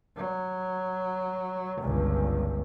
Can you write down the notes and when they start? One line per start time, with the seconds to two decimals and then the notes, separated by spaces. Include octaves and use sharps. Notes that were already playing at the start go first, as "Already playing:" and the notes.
0.16 F#3
1.81 G1 C#2